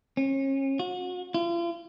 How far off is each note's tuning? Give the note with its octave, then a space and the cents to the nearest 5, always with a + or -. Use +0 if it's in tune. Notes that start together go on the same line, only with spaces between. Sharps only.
C#4 -35
F#4 -35
F4 -40